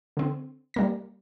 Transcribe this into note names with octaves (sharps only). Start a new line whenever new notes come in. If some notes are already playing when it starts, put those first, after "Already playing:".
D3 C4
G3 A#3 A#6